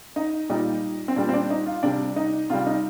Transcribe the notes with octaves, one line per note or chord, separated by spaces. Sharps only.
D#4
A#2 G3 D#4
C4
A#2 G3 D4
C4
D4
D#4
F4
C3 G3 D4
D#4
C3 G3 F4
D#4